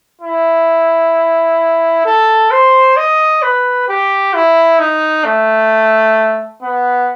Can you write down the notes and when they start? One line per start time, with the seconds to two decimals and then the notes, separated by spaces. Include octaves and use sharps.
0.22 E4
2.05 A4
2.51 C5
2.97 D#5
3.42 B4
3.88 G4
4.34 E4
4.79 D#4
5.25 A3
6.63 B3